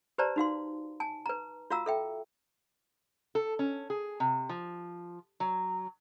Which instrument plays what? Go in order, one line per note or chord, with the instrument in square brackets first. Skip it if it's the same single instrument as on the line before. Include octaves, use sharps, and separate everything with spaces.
[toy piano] G4 B4 C5 D5 A5 A#5
D#4 F#4 F5 C6
G#5 A5
B4 A#5
F4 F#4 F5 A#5 E6
A4 E5 G5
[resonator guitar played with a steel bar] A4
C#4
G#4
C3
F3
F#3